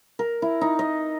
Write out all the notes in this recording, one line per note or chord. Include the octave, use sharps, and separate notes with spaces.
A#4
E4
D#4
D#5